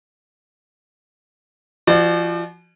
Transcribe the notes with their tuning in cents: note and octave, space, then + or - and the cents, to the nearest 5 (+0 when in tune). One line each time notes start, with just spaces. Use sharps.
F3 -30 F#4 +0 D5 +35